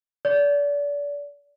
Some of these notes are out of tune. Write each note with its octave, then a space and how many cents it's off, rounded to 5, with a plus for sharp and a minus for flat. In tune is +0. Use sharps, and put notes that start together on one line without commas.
D5 -30